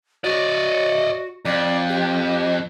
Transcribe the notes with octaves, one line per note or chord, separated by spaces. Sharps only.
F#4 D5 D#5
F2 D5
G4